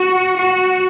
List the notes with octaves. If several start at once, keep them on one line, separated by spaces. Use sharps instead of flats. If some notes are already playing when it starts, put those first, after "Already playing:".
Already playing: F#4
F#4